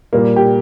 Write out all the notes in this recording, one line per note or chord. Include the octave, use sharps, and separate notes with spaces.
A#2 G3 A#3
G4